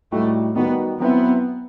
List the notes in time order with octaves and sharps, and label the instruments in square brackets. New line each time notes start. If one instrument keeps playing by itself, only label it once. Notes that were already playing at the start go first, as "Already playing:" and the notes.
[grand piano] A2 G3 D#4 F#4 [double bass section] A3
[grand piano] D#3 G3 D#4 F#4 [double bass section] B3
[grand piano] F#3 C4 E4 [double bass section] B3